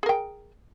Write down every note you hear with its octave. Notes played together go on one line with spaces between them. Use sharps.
G#4 A#4 G5